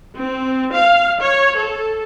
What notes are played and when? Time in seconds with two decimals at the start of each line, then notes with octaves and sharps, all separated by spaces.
0.16 C4
0.73 F5
1.22 C#5
1.57 A4